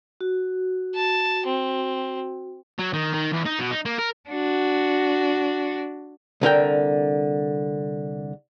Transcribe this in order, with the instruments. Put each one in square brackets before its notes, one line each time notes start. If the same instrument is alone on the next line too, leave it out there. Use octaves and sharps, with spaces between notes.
[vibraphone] F#4
[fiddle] A5
C4
[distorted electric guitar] F#3
D#3
D#3
E2
D#4
B2
D#4
A#3
A#4
[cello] D4 F#4
[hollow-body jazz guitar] C2 D3 A#4 G5